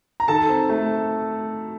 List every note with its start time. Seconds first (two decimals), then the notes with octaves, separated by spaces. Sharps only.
0.20 A#5
0.28 D#3 A4 A5
0.49 C4
0.69 A3